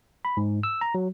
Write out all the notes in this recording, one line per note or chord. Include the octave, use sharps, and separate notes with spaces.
B5
G#2
E6
A#5
F#3